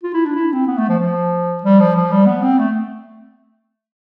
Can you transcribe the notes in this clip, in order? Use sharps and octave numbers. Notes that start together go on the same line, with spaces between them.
F4
E4
D4
E4
C4
B3
A3
F3
F3
G3
F3
F3
G3
B3
C4
A3